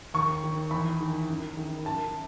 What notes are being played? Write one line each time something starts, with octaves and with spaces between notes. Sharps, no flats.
D#2 C#6
D#3
E2 B5
D#3
F#2
D#3
F#2 A5